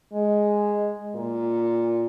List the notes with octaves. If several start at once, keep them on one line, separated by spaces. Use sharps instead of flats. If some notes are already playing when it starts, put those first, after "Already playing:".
G#3
A#2